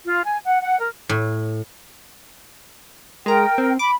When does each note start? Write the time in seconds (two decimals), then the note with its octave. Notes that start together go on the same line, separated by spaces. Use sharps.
0.05 F4
0.23 G#5
0.46 F#5
0.61 F#5
0.79 A#4
1.09 A2
3.26 G#3 A#4 G5 A#5
3.58 C4
3.79 B5 D6